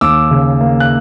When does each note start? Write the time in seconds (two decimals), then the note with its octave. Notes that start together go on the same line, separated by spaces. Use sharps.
0.01 D#2 D6 E6
0.31 C#3
0.61 A#3
0.80 F#6